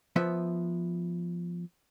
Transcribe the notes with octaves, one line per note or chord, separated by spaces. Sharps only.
F3 B3 E5